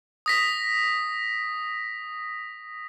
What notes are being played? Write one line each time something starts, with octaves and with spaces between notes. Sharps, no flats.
D#6 A#6 B6